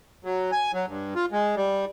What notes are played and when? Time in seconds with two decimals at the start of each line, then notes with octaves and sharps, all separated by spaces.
0.24 F#3
0.52 G#5
0.73 F#3
0.88 G2
1.15 F4
1.32 G#3
1.56 G3